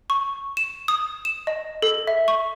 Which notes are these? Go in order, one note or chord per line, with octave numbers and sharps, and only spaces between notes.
C#6
E7
D#6
E7
D#5
A4
E5
C#6